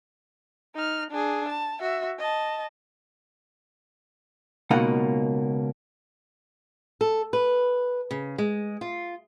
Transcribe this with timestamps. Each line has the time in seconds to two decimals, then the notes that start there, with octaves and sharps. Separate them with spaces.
0.75 D#4 F6
1.11 D4 G#4
1.49 A5
1.81 F#4 E5
2.19 D#5 A5
4.71 C#2 B2 A#3 D#4 F#5
7.01 A4
7.33 B4
8.11 C#3
8.38 G#3
8.81 F4